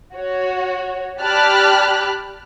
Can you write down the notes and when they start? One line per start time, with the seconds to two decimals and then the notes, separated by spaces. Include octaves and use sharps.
0.15 F#4 C#5
1.21 G4 D5 A5 B5 F6 F#6